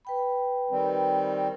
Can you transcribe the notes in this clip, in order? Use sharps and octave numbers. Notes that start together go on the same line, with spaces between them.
B4 G5 B5
D#3 G3 C4